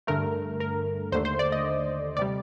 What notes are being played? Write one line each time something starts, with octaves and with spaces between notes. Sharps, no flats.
G2 D3 A3 A#4
A#4
D#2 D3 A3 C5
C5
D5
D#5
C3 G3 D5